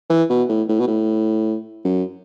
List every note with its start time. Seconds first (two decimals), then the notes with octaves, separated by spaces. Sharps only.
0.10 E3
0.30 B2
0.49 A2
0.69 A2
0.80 B2
0.88 A2
1.85 F#2